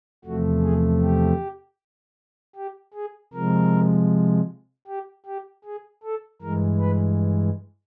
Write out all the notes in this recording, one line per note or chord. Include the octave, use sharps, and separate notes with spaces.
E2 C3 F3 A3 F#4
G#4
G4
G4
G#4
C3 F3 G#3 A#4
G4
G4
G#4
A4
G2 E3 G#3 A#4
B4